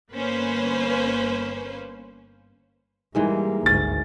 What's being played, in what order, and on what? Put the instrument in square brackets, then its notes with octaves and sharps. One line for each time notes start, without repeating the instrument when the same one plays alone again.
[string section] G1 A#3 C#4 B4 C5
[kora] G#2 E3 G#3 [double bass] G3 A#3
[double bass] G#1 D2 [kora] C#4 [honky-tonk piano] A6